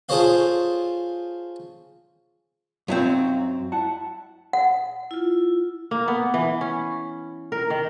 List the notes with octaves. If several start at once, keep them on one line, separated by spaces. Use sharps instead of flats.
F4 G#4 A4 C5 C#5 F5
F#2 F#3 C4 D#4 F4
E4 F#5 A5
F#5
E4 F4
A#3
B3
E3
C#4
A#4
D#3